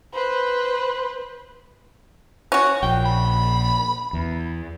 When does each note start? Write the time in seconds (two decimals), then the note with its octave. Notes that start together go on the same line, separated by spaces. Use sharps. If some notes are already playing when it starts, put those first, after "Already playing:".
0.14 B4 C5
2.52 C#4 F#4
2.83 A#1 G5
3.05 B5
4.13 E2